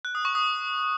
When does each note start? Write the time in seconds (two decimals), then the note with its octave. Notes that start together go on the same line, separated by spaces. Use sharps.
0.05 F#6
0.15 D#6
0.25 C#6
0.35 D#6